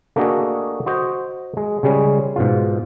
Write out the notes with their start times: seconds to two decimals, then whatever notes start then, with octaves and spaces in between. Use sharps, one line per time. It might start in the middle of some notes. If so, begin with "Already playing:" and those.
0.16 A3 A#3 D4 F#4 G#4 D#5
0.86 F#4 C5 D#5
1.57 G#3
1.83 C#3 G3 G#3 C#4
2.36 G#2 B2 F4